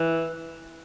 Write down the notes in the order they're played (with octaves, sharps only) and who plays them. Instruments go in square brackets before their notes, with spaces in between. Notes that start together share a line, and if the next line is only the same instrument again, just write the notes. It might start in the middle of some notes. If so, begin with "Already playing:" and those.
Already playing: [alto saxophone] E3